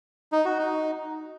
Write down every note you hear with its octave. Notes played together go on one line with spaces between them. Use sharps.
D#4
F#4
D#4